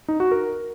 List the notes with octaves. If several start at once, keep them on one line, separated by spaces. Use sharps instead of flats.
D#4
F#4
A#4